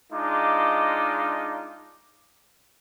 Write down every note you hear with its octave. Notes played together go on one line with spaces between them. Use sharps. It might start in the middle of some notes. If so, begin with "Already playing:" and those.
G#3 D4 D#4 F4 D6